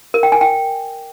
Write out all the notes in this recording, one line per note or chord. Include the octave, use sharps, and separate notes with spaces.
A#4
G5
G#5
G5